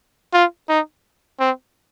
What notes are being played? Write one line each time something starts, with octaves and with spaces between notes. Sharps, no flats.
F4
D#4
C4